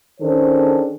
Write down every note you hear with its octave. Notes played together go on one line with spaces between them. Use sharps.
D#3 C#4 D4 G#4 A4 C5